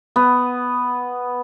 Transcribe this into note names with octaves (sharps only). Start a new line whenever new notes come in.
B3